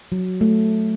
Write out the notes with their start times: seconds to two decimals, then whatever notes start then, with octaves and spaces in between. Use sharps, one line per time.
0.12 F#3
0.41 A3